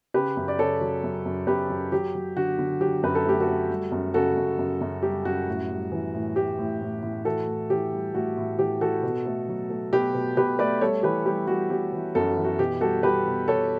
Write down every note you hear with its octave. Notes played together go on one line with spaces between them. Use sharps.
C#3 G4 B4
F#2
D5
C#3 A4 C#5
F#3
F#2
F#2
F#2 G4 B4
F#2
F#3 G4
F#3
D3 F#4
D3
F#3 G4
F#2 B4
A4
A3 G4
F#4 A4
A3
G3
F#2
C#3 F#4 A4
F#2
F#2
F#2
G3 G4
F#2 F#4
A2
G3
E3
A2
A2 G4
A2
A2
A2
E3 F#4 A4
A2
E3 G4
G3
A2 F#4
A2
E3 G4
E3 F#4 A4
B2
A3
F#3
A3
B2 G4 B4
B2
B2 G4 B4
A3 B4 D5
G3 A4 C#5
E3 G4 B4
G3 G4
G3 F#4
G3 G4
E3
F#2 F#4 A4
F#4
E3
F#4
B2 G4
G3 F#4 A4
G3 G4 B4
B2
B2 A4 C#5